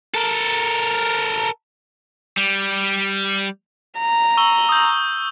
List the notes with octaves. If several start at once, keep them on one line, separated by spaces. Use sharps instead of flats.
A4 A#4
G3
A#5
C#6 E6 G7
D#6 G6